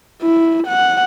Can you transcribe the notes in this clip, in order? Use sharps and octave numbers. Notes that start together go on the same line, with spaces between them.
E4
F#5